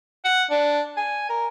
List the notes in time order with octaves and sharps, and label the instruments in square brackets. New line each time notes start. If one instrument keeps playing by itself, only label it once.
[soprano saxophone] F#5
D4
G#5
A#4